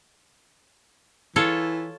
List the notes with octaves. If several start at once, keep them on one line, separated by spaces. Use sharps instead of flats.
E3 F4 A4 C#5